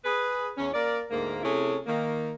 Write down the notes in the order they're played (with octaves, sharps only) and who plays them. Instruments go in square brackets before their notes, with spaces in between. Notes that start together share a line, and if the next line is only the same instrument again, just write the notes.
[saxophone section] G#4 B4
E2 C#4
A#3 A#4 D5
D2 G#2 A#3
C3 A3 C#4 E4 G#4
D#3 A#3